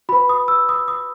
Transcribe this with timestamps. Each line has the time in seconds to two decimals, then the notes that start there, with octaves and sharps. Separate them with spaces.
0.09 F#4 B4 B5
0.29 D#6
0.48 E6
0.69 D#6
0.88 D#6